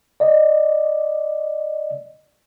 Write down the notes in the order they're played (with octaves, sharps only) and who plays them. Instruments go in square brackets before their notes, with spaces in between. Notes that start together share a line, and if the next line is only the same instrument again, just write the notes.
[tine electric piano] D5 D#5